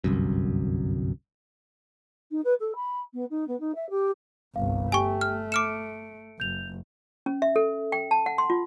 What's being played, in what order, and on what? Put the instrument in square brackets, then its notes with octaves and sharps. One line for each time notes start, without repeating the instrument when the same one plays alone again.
[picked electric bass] G1 C2 F#2
[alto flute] D#4
B4
A4
B5
B3
D#4
B3
D#4
E5
G4
[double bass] G1 C2 [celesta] F5
[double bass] A3 [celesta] G4 G5 [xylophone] G#5 C#6
[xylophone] F6
[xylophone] D6 F6 E7 [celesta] C#7 D7
[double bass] F#1 [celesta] G6 F7
[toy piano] C#4
E5
A4
G5
A5
F#5
C6
F4